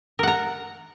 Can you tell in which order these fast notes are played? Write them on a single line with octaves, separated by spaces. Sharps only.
A#4 F#5 A#5